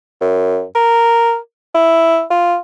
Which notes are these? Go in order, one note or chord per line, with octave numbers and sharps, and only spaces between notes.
F#2
A#4
E4
F4